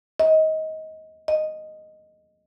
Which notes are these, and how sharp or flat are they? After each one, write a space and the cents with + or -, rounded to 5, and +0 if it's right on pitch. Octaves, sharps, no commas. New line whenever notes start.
D#5 +20
D#5 -5